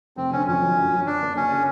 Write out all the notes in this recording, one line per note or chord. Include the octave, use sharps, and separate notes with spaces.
F1 C4
D3 C#4
F2 C#4
F#3
F#2
F#3
D3 D4
A#3
F#1 C#4
C#3